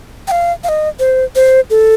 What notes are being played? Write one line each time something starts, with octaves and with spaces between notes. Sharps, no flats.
G5
F5
F5
D#5
C5
C5
A4